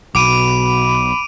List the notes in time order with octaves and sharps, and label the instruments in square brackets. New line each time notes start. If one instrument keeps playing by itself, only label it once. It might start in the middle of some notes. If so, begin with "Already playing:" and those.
[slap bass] B1 [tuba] B2 [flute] B5 [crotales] D6 D7 D#7